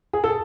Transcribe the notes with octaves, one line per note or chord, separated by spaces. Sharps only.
G#4
A4